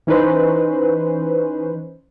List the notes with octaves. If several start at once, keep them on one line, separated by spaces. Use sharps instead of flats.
E3 C#4 D#4 B4 C5